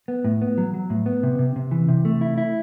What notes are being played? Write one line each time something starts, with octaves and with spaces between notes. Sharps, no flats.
B3
A2
B3
F#3
F#3
A2
B3
C3
C3
C3
E3
C3
A3
E4
E4